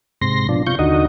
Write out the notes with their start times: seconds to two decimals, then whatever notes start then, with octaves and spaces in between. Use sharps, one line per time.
0.21 G#2 C3 C6 A#6
0.49 B2 F3 D4
0.67 C3 F4 C#6 G6
0.79 D#2 D3 D#4 F#4 D#5